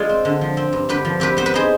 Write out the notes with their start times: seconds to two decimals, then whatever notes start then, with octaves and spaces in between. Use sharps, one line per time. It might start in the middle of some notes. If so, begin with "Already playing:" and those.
Already playing: G#3 F4 G#4 D5
0.09 C4
0.25 D3
0.41 F3
0.57 C4
0.73 G2
0.89 D3 G4 B4
1.05 F3
1.20 C4 G4 B4
1.37 B3 C5
1.46 B4
1.54 D#4 G#4 C5